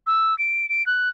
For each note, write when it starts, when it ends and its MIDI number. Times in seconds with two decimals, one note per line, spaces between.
0.07 0.37 88
0.39 0.69 98
0.69 0.85 98
0.86 1.09 90